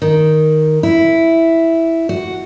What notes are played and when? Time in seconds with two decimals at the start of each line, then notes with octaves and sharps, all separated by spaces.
0.02 D#3
0.83 E4
2.09 F#4